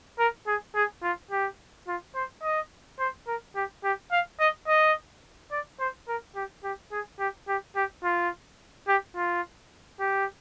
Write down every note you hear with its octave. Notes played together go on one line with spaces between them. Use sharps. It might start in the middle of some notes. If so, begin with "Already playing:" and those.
A#4
G#4
G#4
F4
G4
F4
C5
D#5
C5
A#4
G4
G4
F5
D#5
D#5
D5
C5
A#4
G4
G4
G#4
G4
G4
G4
F4
G4
F4
G4